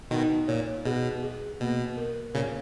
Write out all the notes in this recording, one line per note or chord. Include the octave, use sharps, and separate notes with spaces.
B2 D#3 D#4
A#2 C#5
B2 G#4
G#4
B2 A#3
A#4
A#2 C#3 C#5